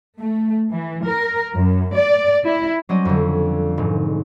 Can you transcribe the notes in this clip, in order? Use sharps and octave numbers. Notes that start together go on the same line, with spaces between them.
A3
E3
A#4
F#2
D5
E4
F#3 G3 C4 C#4 D5 D#5
F2 D3
E1 G#2